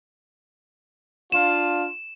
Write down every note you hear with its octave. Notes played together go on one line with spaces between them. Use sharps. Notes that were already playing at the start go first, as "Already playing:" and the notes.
D4 F4 E7